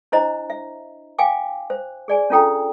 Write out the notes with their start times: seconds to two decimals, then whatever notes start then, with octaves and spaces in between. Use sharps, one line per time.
0.12 D4 E4 C5 D#5 A#5
0.50 E5
1.19 F5 G5 G#5 D6
1.70 C5
2.08 G#4 D5 G#5
2.30 C#4 D4 F4 A4 G5 A#5